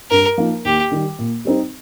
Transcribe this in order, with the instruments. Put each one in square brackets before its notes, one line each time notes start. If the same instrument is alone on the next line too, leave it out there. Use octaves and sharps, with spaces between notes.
[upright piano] G2 [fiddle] A#4
[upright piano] F3 A#3 D#4
[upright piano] D#2 [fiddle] G4
[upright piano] D#3 G3
A#2
G3 C4 D#4